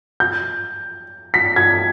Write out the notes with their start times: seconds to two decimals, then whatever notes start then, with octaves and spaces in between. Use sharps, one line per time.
0.20 G6
1.34 B6
1.56 G#6